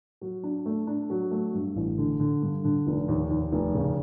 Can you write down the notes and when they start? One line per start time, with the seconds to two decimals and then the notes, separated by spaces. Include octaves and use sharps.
0.21 F#3
0.44 D4
0.66 A3
0.87 D4
1.10 F#3
1.31 A3
1.54 G2
1.76 A1
1.98 D3
2.20 D3
2.42 G2
2.64 D3
2.87 F1
3.08 D#2
3.30 D#2
3.52 F1
3.74 C#3